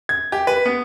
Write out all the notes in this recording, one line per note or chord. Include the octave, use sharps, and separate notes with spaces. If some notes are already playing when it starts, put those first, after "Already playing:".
G#6
G4
B4
B3